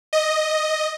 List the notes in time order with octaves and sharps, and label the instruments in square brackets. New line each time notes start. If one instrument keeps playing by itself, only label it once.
[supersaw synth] D#5